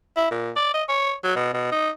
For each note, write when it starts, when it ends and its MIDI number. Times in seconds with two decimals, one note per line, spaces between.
0.17 0.26 64
0.31 0.51 46
0.56 0.72 74
0.74 0.83 75
0.89 1.13 73
1.24 1.35 54
1.36 1.53 47
1.53 1.72 47
1.72 1.90 63